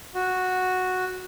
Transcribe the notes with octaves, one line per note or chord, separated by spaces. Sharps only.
F#4